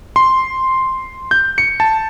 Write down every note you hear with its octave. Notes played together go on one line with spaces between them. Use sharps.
C6
G6
C#7
A5